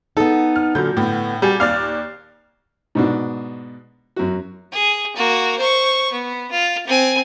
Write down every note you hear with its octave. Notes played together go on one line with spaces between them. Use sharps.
B3 D#4 A4
F6
A#2 D3 F#3 G6
A2 D3 B3
A#2 G3 F#4 G#5
D#2 D5 F5 A6
G#2 B2 D4
F#2 F#4
G#4
A#3 F#4
C5 C#6
B3
F4
C4 G#5